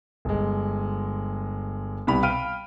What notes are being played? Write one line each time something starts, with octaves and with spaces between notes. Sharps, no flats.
G1 G#3
C2 B2 G4 B5 F7
F5 G5 B5 F6 D7 D#7